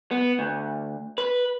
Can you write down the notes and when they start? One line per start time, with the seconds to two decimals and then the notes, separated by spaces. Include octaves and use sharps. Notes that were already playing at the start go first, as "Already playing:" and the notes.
0.11 B3
0.39 D2
1.18 B4